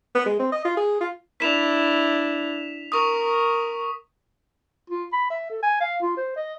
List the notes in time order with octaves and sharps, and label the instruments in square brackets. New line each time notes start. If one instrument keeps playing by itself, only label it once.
[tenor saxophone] B3
G#3
C4
D#5
F4
G#4
F4
[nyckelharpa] D4 E4 [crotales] B6 E7 F7
[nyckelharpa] A#4 [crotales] C#6 D#6
[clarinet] F4
B5
E5
A4
G#5
F5
F4
C5
D#5